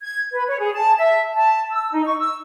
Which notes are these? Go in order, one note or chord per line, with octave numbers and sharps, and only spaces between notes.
G#6
B4
C#5
G#4
A5
E5
A5
E6
D#4
C#6
E6